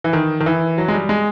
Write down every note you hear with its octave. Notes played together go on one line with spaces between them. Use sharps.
E3
D#3
D#3
E3
F#3
G#3
G3
G#3